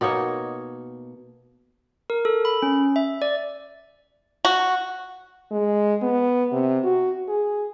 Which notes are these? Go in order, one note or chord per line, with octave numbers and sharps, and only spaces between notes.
B2 A#3 D#4 C#5
A#4
A4
B5
C#4
E5
D5
F#4
G#3
B3
C3
F#4
G#4